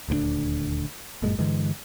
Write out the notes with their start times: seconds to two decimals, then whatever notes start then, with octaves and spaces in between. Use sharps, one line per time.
0.08 D#1 D2 G#3 D4
1.22 G1 F#2 A#2 G#3
1.39 G2 D3 E3 G#3